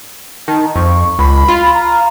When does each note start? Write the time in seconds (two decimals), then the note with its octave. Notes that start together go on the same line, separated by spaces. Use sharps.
0.48 D#3 A5
0.76 F2 C#6
1.19 C#2 B5
1.48 F4
1.74 A#5